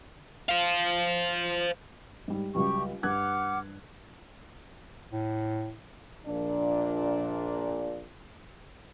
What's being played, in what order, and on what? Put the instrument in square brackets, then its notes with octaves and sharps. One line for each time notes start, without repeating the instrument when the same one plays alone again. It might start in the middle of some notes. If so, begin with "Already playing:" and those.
[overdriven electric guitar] C5 F5
[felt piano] G#2 G3
[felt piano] C#2 F#3 G3 [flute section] G4 C#6
[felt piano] G2 F#6 G#6 [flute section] F#5 D6 F6
[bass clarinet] A2
[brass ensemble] A#1 A#2 D4